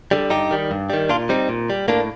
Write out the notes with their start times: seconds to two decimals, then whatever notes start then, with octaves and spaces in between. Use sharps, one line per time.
0.11 D3 G3
0.30 G2 D#4 G4
0.51 D#3 G3
0.71 G2
0.90 D#3 G3
1.09 A#2 D4 F4
1.29 G3 C4 D#4
1.49 A#2
1.70 G3
1.88 A2 A#3 D4